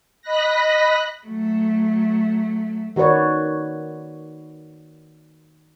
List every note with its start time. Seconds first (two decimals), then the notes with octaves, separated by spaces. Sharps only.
0.22 D#5 B5 F#6 A#6
1.26 F#3 A3
2.96 D#3 F#4 B4 C#5 D5